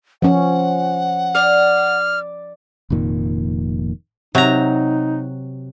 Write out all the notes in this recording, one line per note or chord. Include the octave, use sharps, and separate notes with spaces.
F3 C#4 F#5
D5 F6
F1 F2 A#2 D#3
C3 F#3 D#4 A#5